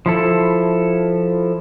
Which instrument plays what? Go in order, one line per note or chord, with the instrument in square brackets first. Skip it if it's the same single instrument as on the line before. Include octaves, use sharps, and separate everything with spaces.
[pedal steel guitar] F3 E4 A4